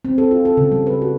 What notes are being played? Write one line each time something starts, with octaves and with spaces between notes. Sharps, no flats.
C4
A4
F4
A4
C#3
G3
B4
F#4